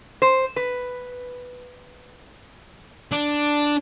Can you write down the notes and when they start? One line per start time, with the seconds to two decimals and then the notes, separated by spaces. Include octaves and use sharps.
0.22 C5
0.56 B4
3.12 D4